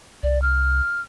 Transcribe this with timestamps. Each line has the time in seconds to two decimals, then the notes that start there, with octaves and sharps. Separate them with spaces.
0.23 C2 D5
0.42 F6